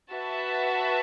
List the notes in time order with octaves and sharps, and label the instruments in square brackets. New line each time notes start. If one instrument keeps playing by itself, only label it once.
[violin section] F#4 B4 E5 A5